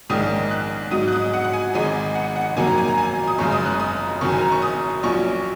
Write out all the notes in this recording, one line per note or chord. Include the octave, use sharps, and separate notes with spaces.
A#1 G#2 D#3 G#3 C#4 D#6
F#6
G#2 F#3 D#4 D#6
F#6
D#6
F#5
F#5
G#5
G#1 G#2 G#3 D#4 G#5
F#5
F#5
G#1 F#2 D#3 F#3 A#3 G#5
A#5
G#5
A#5
G#5
D#6
F#1 F#2 C#3 G#3 C#6
D#6
F#6
D#6
F#1 F#2 D#3 F#3 C#4 C#6
G#5
A#5
C#6
D#6
A#1 A#2 F#3 C#4 C#6